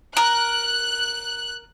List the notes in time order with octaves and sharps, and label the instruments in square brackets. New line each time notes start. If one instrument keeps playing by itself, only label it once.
[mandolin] A#4 [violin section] F#6